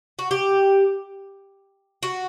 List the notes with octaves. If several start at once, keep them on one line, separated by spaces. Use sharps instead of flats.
F#4
G4
F#4